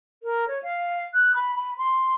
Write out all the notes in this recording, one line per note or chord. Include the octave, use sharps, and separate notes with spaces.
A#4
C#5
F5
F#6
B5
B5
C6